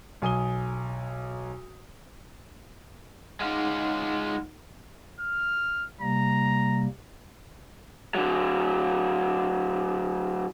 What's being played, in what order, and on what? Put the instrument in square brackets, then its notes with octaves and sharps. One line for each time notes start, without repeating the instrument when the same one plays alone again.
[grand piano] B1 G#5 D#6 G7
[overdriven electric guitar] G#3 F4 [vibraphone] D#4 F#5
[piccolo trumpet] F6
[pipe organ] C3 G3 A#3 [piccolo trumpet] A#5
[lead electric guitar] D3 F#3